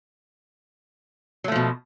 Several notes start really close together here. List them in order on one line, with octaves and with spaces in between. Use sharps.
F#3 A3 F3 B2